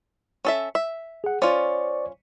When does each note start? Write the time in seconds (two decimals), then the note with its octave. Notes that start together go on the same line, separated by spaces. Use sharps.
0.45 C#4 A4 E5
0.75 E5
1.24 G#4 F#5
1.42 C#4 F4 C5 D5 C#6